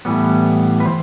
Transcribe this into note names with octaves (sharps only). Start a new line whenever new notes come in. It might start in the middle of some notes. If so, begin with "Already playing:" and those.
A2 E3 G3 B3
B4
E3 C5